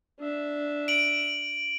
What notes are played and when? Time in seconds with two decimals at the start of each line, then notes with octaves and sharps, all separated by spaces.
0.19 D4 E5
0.88 D7 F#7